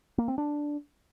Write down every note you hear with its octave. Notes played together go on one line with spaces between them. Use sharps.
A#3
C4
D4